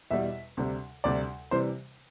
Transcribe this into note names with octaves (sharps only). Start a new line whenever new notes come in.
E2 B2 G3 E5
D2 C3 G3
D2 C3 G3 D5
C3 E3 G3 C5